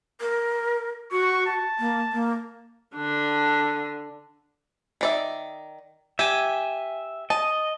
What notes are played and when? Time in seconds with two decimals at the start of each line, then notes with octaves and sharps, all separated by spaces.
0.21 A#4
1.12 F#4 C#6
1.46 A5
1.79 A#3
2.12 A#3
2.95 D3 D4
5.01 D#3 D5 E5
6.19 G4 E5 G#5
7.30 D#5 A5